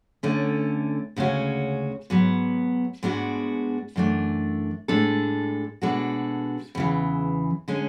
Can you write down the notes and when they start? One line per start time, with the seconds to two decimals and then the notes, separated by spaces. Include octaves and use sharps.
0.23 D2 D3 A3 C#4
1.16 D2 C#3 G#3 C#4 F#4
2.10 G#2 F#3 B3
3.03 G#2 G#3 B3 D4 F#4
3.96 F#2 E3 A3 D4
4.88 A2 G#3 D4 A4
5.82 B2 G#3 D4 F#4 A4
6.75 E2 C#3 E3
7.68 D3 G#3 C#4